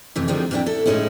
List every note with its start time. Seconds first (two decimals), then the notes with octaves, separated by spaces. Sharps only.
0.16 F2 C3 E3 A3
0.28 D3 D#3 F3 G3 G#3 C4
0.51 F2 A#2 D3 D4 E4 G5
0.66 E4 A4
0.86 A2 G#3 C#4 D#4 E4